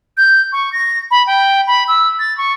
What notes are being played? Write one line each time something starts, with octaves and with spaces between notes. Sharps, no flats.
G6
C#6
A#6
B5
G5
B5
E6
A6
C#6